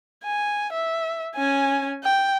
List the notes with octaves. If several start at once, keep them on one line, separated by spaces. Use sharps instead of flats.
G#5
E5
C#4 G#5
G5